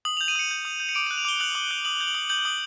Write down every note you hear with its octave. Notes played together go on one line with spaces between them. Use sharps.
D#6 F#7
G6 F7
D#7
D#6 C#7
G6
D#6
G6
C#7
D6 D7
F#6 D#7
F7
D6 G7
F#6 F#7
D6
F#6
D#6 F#7
G6
F#7
D#6
G6 F#7
D#6